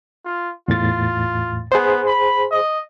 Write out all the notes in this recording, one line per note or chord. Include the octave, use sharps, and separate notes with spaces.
F4
E2 A2 F4 A6
B3 G#4 C5
B5
D#5